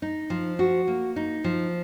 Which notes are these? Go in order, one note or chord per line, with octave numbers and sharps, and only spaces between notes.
D#4
F3
F#4
A#3
D#4
F3